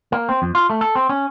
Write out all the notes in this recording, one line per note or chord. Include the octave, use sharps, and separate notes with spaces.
A#3
C4
F2
F4
A3
A4
C4
C#4